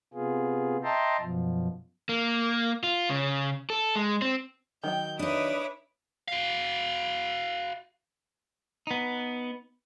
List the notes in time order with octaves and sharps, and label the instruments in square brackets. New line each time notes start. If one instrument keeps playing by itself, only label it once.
[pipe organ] C3 B3 F4 G#4
D#5 E5 G5 A5 A#5 C6
F#2 B2 F3
[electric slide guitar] A#3
F4
C#3
A4
G#3
C4
[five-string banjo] D#3 F#3 G5 [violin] G6
[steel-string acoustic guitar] D4 D#4 [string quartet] B4 D6 D#6 [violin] C#5 E5
[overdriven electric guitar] F#4 F5
[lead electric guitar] B3 D#4